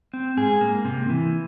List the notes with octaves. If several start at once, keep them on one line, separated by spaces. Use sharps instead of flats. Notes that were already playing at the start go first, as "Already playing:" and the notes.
C4
G#2 G#4
A#3
C3
E3